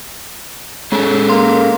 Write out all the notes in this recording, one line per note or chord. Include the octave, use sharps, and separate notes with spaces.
G#3 C#4 G#4 A4
A#3 C6